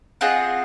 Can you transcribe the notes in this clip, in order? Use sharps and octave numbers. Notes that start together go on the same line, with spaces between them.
C4 F4 G#4 D#5 F#5